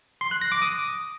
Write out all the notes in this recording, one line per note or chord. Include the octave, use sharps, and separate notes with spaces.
C6
F#6
A#6
D6
D#6